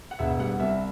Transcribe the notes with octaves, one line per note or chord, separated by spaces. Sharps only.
F#5
E1 E5
G3 F#5
C2 E5